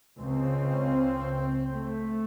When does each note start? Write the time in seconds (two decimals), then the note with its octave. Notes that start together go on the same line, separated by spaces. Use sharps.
0.18 C#2 C#3 C4
1.71 A3